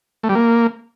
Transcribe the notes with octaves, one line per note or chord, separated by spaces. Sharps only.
A3
G3
A#3